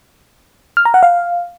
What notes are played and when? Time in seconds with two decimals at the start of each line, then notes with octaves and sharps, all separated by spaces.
0.77 F6
0.85 A#5
0.94 F#5
1.03 F5